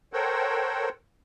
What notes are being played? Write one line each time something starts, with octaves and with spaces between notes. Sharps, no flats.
A4 A#4 C5 C#5 F#5 G5